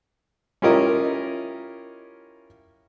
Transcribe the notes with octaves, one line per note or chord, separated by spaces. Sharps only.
C#4 E4 F4 G4 A#4 D#5